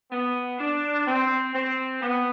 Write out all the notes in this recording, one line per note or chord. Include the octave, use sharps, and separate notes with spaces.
B3
D4
C4
C4
B3